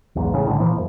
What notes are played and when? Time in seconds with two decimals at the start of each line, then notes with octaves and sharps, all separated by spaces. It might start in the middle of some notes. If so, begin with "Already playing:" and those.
0.15 B1 E2 G#2
0.33 A1 A2 C#3
0.45 C2 A2 D3
0.60 A#2 E3 F3
0.75 D#1 F#2